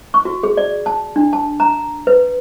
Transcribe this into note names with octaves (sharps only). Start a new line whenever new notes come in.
C#6
F#4
G#4
D5
A5
D4
A5
A#5
B4